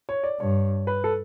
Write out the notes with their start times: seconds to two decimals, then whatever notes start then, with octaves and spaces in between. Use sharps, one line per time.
0.09 C#5
0.24 D5
0.40 G2 C#5
0.87 B4
1.04 A4